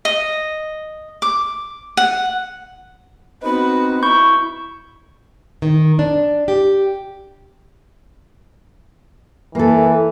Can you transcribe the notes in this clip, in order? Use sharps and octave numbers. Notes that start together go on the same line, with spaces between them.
D#5
D6
F#5
B3 C4 D#4 F#4 B4 B5
E4 C#6 G6
D#3
D4
G4
E3 A#3 A4